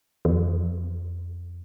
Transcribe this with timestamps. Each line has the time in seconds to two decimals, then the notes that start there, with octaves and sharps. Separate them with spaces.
0.25 E2
0.31 F2